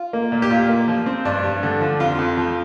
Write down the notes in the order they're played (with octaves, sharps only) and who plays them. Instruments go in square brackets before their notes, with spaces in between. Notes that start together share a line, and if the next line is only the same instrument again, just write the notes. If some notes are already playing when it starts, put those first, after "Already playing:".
Already playing: [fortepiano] F4
A#3
A#2
G4
A#2 F4
A#3
F3
C4
G2 D4
G2
D3
F3
F2 F4
F2
F3